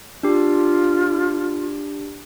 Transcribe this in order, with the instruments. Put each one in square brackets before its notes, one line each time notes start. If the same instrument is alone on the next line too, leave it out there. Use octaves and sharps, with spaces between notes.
[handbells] D4 G4 [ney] F4